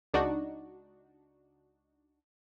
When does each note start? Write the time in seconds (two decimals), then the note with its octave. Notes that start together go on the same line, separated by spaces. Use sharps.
0.13 C#2 D4 D#4 F#4